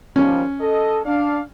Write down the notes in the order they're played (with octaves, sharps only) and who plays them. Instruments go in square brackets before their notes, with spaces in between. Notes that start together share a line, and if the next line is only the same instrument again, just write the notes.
[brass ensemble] D#2 F3 G3 [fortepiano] C#4
[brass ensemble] A4 D#5
D4 D5 F5